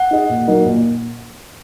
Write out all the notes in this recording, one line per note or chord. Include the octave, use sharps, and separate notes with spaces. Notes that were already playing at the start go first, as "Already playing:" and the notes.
Already playing: F#5
D#4 G#4 D#5
A#2
F#3 A#3 D#4
A#2